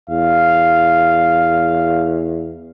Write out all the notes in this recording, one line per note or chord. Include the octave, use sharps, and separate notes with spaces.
E2 F5